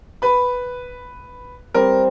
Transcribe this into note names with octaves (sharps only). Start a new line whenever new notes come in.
B4 B5
G3 C4 A#4